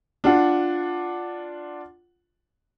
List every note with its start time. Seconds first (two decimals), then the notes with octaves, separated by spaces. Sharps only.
0.24 D4 F4 F#5